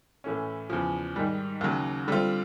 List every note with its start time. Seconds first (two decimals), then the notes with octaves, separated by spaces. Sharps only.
0.24 A2 E3 A3 C#4
0.70 E2 C#3 F3
1.16 G#2 D#3 G3
1.61 D#2 C#3 F#3
2.08 D3 G3 C4 F4